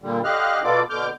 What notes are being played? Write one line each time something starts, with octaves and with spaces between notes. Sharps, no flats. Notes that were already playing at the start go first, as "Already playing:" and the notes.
A#2 D3 G3
D3 G4 D#5 F5 F6 F#6
B2 B3 F4 A4 D5 D6
B2 D3 D6 F6 G6